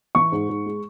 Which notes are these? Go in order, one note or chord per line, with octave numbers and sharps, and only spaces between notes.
E3 C#6
G#2
G#2
G#3